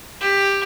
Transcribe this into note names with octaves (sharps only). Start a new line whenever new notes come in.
G4